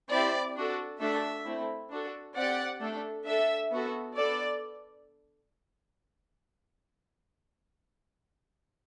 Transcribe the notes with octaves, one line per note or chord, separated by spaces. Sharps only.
C4 E4 G4 D5
D4 F#4 A4
A3 D4 F#4 A4 E5
A3 C4 E4
D4 F#4 A4
C4 G4 D5 F#5
A3 D4 A4
D4 A4 E5
B3 F#4 A4
B3 D4 A4 D5